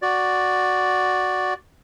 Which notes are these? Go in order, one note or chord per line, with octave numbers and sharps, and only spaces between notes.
F#4 D5